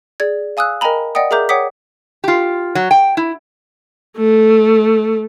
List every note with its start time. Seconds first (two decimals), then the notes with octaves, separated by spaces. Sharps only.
0.20 G#4 D5 G#6
0.57 F5 G#5 D#6 E6 F#6
0.81 A#4 D#5 G5 G#5 A#5 B5
1.15 D5 D#5 F#5 G5 D#6
1.31 G#4 A#4 E5 A#5 D6 G6
1.49 C#5 F#5 G5 D6 D#6 B6
2.24 F4 G4
2.75 F#3
2.91 G5
3.17 E4
4.17 A3